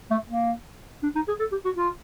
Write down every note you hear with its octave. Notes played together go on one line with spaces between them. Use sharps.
A3
A#3
D4
D#4
G#4
A4
G4
F#4
F4